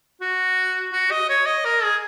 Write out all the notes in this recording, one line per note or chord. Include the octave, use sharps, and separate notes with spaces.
F#4
F#4
D#5
C#5
D#5
A#4
G#4